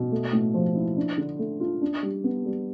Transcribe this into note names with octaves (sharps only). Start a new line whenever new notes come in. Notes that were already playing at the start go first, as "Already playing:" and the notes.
Already playing: B2
A3
A2
F3
E4
D4
D3
A3
F4
D4
G3
B3
G3